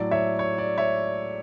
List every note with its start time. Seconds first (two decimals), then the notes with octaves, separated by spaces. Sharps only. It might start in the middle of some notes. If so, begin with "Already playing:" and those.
Already playing: A2 F#3 A3 D5
0.11 C#5 E5
0.39 C#5
0.58 D5
0.78 C#5 E5